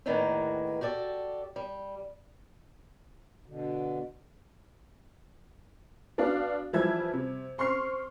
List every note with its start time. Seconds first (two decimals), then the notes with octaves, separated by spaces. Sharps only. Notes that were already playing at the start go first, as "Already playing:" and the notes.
0.06 E2 A2 D3 D#3 A#3 B4
0.81 F#4 G4 A4 D5
1.56 G3
3.46 B2 D3
6.18 B3 D4 F#4 D5 F5
6.73 E3 F3 G3 E5 E6 G#6
7.13 C3
7.58 C4 C6 C#6 F6 C7